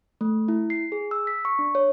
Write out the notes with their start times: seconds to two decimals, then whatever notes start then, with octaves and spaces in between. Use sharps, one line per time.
0.21 A3
0.48 E4
0.70 C7
0.92 G#4
1.11 E6
1.27 B6
1.45 C#6
1.59 D4
1.75 C#5